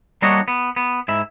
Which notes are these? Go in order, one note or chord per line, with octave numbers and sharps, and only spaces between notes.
G3 A#3 D4 F#4 C#5 D#5
B3
B3
G#2 E4 E5